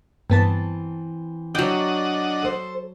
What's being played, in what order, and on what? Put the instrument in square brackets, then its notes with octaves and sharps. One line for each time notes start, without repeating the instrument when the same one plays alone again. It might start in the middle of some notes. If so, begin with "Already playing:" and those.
[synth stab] G2 B3 A5 [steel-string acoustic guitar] E3 C4
[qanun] F#3 G5 [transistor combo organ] D4 D#5 F#5
[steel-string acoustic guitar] A4 C5